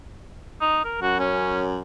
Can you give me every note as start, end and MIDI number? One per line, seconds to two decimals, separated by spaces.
0.61 0.81 63
0.85 0.97 70
1.02 1.81 42
1.02 1.18 66
1.19 1.65 61